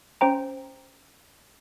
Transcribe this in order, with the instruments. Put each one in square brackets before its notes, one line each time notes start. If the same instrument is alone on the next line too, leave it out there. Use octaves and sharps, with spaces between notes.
[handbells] C#4 C5 G5 A#5